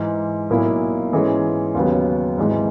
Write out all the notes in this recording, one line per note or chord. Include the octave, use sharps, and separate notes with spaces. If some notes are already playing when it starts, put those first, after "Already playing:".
Already playing: G#2 E3 G#3
B1 A#2 A#3 E4
G#2 E3 G#3 C#4 G#4
D#2 C#3 F#3 B3
G#1 G#2 E3 G#3